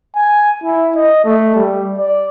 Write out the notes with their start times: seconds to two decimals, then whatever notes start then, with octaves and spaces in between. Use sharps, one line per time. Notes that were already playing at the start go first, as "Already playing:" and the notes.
0.15 G#5
0.64 E4
0.96 D#5
1.24 A3
1.55 G3
1.98 D5